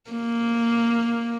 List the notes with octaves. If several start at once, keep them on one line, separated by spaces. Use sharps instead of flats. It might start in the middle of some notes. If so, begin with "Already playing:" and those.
A#3